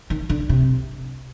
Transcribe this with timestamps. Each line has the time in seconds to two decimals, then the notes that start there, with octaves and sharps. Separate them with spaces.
0.10 D#3
0.29 D3
0.49 C3